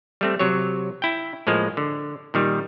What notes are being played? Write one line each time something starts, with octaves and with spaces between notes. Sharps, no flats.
G3 A3 C4
C3 F#3 C#5
E4 G5
A2 F3 G#3 A#3
D3
A#2 D#3 G3